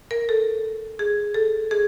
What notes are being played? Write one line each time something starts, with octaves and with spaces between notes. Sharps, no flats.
A#4
A4
G#4
A4
G#4